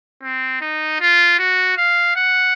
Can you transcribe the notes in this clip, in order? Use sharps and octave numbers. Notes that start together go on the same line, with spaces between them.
C4
D#4
F4
F#4
F5
F#5